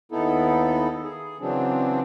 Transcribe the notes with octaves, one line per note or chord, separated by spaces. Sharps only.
D#2 B3 D#4 E4 A4
G#4
C#3 E3 F#3 C4 D4